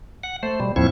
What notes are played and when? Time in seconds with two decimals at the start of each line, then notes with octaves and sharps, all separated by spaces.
0.23 F#5
0.43 A3 C5
0.60 B2 G3
0.76 D#2 A2 F3 C4 E4 C#6